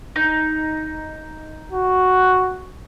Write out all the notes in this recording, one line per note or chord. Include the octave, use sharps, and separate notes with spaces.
D#4
F#4